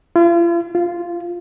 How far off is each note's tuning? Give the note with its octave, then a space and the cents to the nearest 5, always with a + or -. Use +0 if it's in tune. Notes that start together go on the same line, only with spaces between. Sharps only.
F4 -40
F4 -5